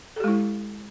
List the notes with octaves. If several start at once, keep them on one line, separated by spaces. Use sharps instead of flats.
G#3 E4 G4 A4